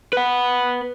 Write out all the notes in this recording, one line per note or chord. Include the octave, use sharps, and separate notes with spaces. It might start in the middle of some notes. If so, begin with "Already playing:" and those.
B4 F#5